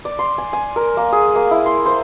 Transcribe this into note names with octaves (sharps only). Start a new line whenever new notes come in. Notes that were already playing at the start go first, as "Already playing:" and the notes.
D5
C6
G#5
G#5
A#4
A#3
G#4
A#3
E4
C6
C5